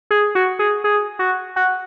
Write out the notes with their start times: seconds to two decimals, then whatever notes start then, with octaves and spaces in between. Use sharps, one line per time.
0.11 G#4
0.35 F#4
0.59 G#4
0.84 G#4
1.19 F#4
1.56 F#4